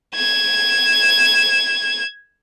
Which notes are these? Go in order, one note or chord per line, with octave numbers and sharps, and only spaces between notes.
G#6 E7